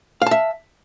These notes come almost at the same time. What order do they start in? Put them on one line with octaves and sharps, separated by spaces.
F5 A5 E5